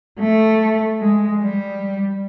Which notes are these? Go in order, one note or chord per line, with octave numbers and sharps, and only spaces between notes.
A3
G#3
G3